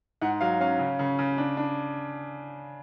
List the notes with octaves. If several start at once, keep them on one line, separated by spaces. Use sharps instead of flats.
G#2 F#5
F#3 F5
C#4 F5
C#3
C#3
C#3
D4
D4